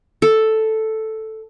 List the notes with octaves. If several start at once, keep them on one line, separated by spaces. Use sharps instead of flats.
A4